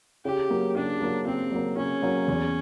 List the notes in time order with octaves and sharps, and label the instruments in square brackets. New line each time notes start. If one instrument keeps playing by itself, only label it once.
[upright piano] C#3 [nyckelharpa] G4
[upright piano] F#3 A#3
[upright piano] C#3 [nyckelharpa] D4
[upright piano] F#3 A#3
[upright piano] C#3 [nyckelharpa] C4
[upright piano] F#3 A#3
[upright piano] C#3 [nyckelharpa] C#4
[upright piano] F#3 A#3
E2